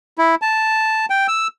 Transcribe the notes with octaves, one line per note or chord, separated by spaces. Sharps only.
E4
A5
G5
E6